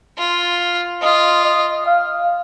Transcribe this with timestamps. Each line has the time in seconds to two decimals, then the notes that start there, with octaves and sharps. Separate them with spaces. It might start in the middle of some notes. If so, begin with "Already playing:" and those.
0.18 F4
1.02 F4 D#5
1.45 D#5
1.86 F5